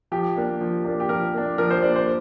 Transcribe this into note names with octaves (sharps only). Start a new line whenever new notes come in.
F3 G4
A#3 D4
F3
A#3 D4
G4
F3 A#4
A#3 D4
F3 A#4
C5
A#3 D4 D5
C5